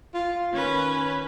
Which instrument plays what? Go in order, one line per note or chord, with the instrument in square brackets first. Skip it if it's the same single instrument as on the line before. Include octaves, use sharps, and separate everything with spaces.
[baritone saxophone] F4
[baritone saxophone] D#3 [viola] C#4 B4